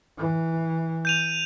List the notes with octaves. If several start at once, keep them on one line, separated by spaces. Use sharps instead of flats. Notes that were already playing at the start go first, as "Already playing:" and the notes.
E3
G6 D#7 F7